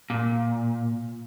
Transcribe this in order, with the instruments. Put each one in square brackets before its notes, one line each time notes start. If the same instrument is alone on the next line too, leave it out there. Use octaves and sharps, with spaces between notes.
[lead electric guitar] A#2